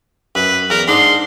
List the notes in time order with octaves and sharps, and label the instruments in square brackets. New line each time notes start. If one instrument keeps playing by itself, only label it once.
[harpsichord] F#2 [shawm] B4
[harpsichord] E2 [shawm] A#4
[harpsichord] G#2 D4 D#4 [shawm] C6